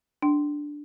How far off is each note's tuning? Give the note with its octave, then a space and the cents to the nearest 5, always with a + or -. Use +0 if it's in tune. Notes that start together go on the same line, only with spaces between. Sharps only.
D4 +0 G5 -30